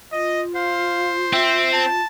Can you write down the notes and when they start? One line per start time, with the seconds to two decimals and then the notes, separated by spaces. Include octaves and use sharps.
0.12 F4 D#5
0.55 C5 F5
1.33 C4 E5
1.73 A5